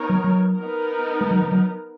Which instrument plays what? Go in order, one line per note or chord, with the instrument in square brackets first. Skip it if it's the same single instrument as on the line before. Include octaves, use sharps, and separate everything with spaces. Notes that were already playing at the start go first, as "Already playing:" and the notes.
Already playing: [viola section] B3 D#4 A#4 C#5
[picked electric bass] F#3
F#3
[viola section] B3 D#4 A#4
[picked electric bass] G#3
F#3
F3
F#3